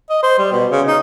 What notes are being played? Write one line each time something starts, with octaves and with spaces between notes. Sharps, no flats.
D#5
C5
G3
B2
C#3
D#4